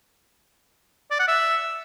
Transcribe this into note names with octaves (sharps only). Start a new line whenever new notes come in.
D5
F#5
E5